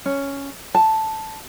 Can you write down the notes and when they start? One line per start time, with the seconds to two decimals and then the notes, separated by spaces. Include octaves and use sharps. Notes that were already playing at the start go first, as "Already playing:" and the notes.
0.06 C#4
0.75 A5